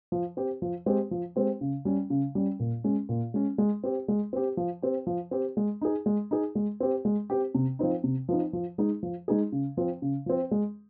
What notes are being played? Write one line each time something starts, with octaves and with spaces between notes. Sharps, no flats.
F3
C4 G4
F3
G#3 C4 G4
F3
G#3 C4 G4
C#3
G3 C#4
C#3
G3 C#4
A#2
G#3 C#4
A#2
G#3 C#4
G#3
C4 G4
G#3
C4 G4
F3
C4 G4
F3
C4 G4
G#3
D#4 G#4
G#3
D#4 G#4
G#3
C4 G4
G#3
C4 G4
C3
F3 C4 D#4
C3
F3 C4 D#4
F3
G#3 D#4 G#4
F3
G#3 D#4 G#4
C#3
F3 C4
C#3
F3 C4
G#3